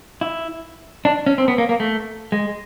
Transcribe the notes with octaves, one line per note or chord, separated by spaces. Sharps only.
E4
D4
C#4
C4
B3
A#3
A#3
A3
G#3